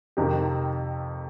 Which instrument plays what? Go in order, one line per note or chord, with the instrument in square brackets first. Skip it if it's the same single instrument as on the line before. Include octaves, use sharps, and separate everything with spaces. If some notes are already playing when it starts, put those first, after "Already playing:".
[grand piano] F2 C3 D#3 G4